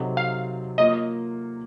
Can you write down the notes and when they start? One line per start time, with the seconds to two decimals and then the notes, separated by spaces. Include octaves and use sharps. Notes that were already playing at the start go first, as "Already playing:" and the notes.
Already playing: C3 F#3 C4 D#4 A4
0.17 F5
0.78 A#3 F4 A#4 C#5 D#5